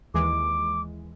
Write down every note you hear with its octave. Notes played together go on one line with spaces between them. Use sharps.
D#2 E3 G#3 D6